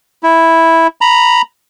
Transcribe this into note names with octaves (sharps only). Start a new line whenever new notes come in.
E4
A#5 B5